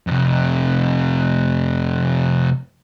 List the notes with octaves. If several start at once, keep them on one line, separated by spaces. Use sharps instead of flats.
F2 C3